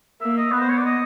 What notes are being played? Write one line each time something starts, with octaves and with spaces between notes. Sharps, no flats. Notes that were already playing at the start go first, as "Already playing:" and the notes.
A#3 E5
D#5
B3 B4
C5
C#5
D5
D#5